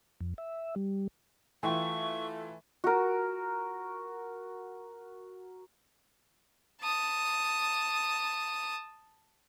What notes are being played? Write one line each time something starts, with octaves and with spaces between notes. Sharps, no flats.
F2
E5
G3
E3 A3 F4 G5 C6 C#6
F#4 A#4
A5 D#6